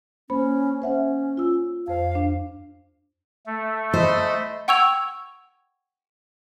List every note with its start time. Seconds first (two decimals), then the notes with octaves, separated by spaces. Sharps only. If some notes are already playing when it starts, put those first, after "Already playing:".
0.30 A#3 C#4 C5 B5
0.82 C#4 C5 E5 F#5
1.37 F4 E6
1.88 F2 C5 F5
2.15 D4
3.46 A3
3.94 C5 D#5 B5
4.68 F#5 G5 C#6 E6 G#6 F7